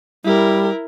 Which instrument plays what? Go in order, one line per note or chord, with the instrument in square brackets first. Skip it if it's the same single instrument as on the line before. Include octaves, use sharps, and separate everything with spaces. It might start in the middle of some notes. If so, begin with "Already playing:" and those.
[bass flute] G3 [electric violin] E4 A#4